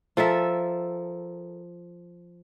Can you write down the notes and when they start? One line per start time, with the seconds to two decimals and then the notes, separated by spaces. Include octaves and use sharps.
0.17 F3 A4 A#4 E5